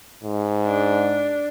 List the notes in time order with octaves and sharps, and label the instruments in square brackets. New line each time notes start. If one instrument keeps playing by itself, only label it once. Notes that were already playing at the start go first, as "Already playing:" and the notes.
[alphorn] G#2
[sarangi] D4